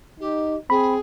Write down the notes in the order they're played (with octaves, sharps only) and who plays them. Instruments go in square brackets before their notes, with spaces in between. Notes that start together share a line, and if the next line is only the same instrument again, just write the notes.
[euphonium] D#4 [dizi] G4
[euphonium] C4 [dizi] G#4 [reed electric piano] B5